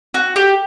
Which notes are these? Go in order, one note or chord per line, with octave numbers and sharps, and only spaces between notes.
F#4
G4